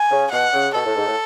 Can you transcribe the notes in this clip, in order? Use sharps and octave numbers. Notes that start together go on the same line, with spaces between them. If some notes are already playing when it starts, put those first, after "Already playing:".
Already playing: G#5
C#3
B2 F#5
C#3
B2 A4
A2
G#2
A2